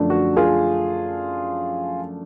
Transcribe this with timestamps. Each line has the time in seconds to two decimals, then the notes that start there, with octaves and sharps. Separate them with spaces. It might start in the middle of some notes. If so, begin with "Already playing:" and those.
Already playing: F#2 D3 F3 A3 D4
0.10 F#4
0.36 F4 G#4